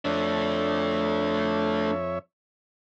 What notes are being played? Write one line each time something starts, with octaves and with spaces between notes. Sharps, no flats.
F2 A3 D4 C#5 E5